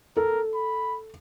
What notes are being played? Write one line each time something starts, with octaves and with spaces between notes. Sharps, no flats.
A4 A#4
B5